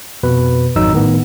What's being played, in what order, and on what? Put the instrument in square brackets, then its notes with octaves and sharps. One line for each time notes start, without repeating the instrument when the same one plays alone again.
[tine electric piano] F2 B2 B4
G#1 F2 F#3 D#4 E6
A2 D#3 B3